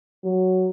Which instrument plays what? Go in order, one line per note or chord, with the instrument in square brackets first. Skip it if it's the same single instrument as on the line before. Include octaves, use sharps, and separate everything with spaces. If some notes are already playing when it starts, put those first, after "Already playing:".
[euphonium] F#3